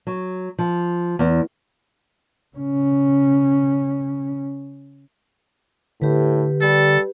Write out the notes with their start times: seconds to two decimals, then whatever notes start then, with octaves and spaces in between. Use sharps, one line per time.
0.07 F#3
0.58 F3
1.19 E2
2.56 C#3 C#4
6.02 A2 D3 G4 B4
6.61 G3 A4